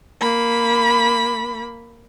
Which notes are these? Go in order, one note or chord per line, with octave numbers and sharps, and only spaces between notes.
A#3 B5